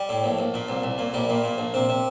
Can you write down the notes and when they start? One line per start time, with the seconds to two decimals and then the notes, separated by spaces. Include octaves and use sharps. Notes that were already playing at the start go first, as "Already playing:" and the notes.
Already playing: G3
0.09 A2
0.24 A#1
0.39 A#1
0.54 A#2
0.69 C2
0.83 C2
0.98 A#2
1.14 A#1 G3
1.29 A#2
1.44 A#2
1.58 A#1
1.74 C3
1.89 C3